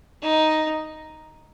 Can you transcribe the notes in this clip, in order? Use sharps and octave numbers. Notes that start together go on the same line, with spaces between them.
D#4